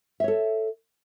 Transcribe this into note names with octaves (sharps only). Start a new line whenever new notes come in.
A4 C#5 E5